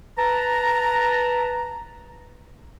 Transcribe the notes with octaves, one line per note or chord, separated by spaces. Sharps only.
B4 A5 A#5